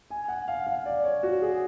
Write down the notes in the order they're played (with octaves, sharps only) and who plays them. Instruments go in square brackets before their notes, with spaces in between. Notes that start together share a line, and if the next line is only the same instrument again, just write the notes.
[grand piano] G#5
F#5
F5
F5
D5
C#5
F#4
G#4